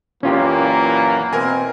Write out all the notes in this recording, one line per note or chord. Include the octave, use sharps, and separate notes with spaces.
F#2 A#2 E3 A#3 C#4 F4 G4
B2 E3 C4 A#4 G#5